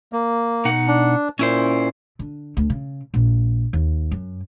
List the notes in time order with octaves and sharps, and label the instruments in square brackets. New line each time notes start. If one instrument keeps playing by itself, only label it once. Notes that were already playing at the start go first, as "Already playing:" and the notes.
[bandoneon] A#3
[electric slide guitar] B2 D#4 F#5
[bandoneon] D4
[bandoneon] A#2 [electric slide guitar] C#4 E4 C5
[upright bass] D3
D2
C#3
A#1
D#2
F#2